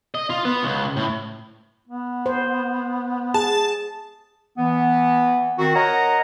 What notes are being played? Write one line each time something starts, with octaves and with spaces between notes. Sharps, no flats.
D#5
F4
B3
C#2
A2
B3
C5
G#4 A5
E3 B3
D#3 C4 F#4
A#4 C#5 D#5 F#5 A#5